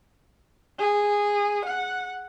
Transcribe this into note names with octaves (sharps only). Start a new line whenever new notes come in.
G#4
F#5